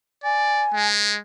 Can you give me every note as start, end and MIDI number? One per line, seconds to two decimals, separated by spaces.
0.24 0.65 74
0.24 0.87 80
0.74 1.17 56